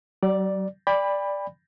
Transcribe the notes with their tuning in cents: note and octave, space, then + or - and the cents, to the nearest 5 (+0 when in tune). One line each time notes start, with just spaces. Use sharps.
F#3 +45 D5 +0
D5 +0 G5 +35 B5 +0